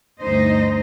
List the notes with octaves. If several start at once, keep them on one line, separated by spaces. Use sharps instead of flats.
D2 G2 D#4 C5 D#5